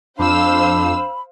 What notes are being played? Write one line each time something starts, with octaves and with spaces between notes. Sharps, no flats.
F2 D4 C5 F5 B5 E6